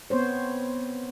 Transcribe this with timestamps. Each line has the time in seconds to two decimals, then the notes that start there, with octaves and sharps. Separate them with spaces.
0.10 B3 C4 C5 C#5